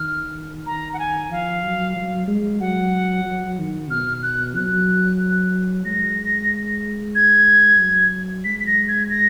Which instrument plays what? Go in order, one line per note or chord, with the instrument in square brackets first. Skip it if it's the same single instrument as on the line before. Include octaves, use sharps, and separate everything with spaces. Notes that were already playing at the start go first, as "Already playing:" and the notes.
Already playing: [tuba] D#3 [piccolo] F6
[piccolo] A#5
F#5
G#5
[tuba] F3 [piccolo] F5
[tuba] F#3
F#3
G#3
[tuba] F#3 [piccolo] F#5
[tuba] F#3
D#3
[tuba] B2 [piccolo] F6
[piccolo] F#6
[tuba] F#3 [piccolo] F#6
[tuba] G#3 [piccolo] A#6
[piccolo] G#6
[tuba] F#3
[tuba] G#3 [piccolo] B6
[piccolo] B6
A#6
G#6
A#6